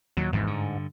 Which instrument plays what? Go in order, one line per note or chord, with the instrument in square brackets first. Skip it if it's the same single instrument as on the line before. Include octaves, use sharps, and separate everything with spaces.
[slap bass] D#2 A#2 [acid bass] F#3
[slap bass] G#1 E2 C3 [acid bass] G#2
[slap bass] G2 D3